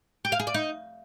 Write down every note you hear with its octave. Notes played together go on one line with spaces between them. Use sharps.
G4
F5
G#4
D5
D#4